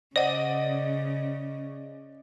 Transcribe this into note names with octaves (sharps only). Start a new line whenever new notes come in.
C#3 C5 D5 D#5 F#5